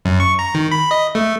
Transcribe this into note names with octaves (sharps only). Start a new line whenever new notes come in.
F#2
C#6
A#5
D#3
B5
D#5
A3